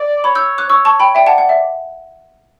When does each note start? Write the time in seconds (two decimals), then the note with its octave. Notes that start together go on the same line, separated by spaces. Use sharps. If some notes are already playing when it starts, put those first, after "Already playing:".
Already playing: D5
0.24 C#5 B5 D6
0.35 E6 G6
0.58 D6 F#6
0.69 C#5 C#6 E6
0.85 A5 C#6
1.00 G5 B5
1.15 D5 E5 G5
1.26 F#5 A5
1.38 F#5
1.49 E5